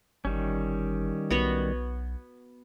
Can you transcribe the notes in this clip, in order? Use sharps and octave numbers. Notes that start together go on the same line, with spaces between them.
G1 D#3 G3 C#4
B1 B3 F#4 C#5